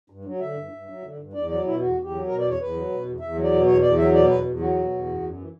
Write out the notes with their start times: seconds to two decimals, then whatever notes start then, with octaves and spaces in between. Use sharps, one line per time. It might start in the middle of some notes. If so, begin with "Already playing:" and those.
0.10 G2
0.25 F#3
0.40 D3 E5
0.56 G2
0.72 G2
0.87 F#3
1.02 D3
1.18 G2
1.33 E2 D5
1.49 F#3 D5
1.64 B2 E4
1.80 E2 F#4
1.96 E2
2.03 G4
2.11 F#3
2.27 B2 A#4
2.39 D5
2.42 E2
2.50 C#5
2.58 E2 B4
2.73 F#3
2.89 B2
3.04 E2
3.20 E2 E5
3.35 F#3
3.44 D5
3.51 B2
3.66 E2 C#5
3.82 E2 D5
3.98 F#3 E5
4.13 B2 D5
4.28 E2 B4
4.44 E2
4.59 F#3 F#4
4.75 B2
4.90 E2
5.06 F#2
5.22 F#2
5.37 E3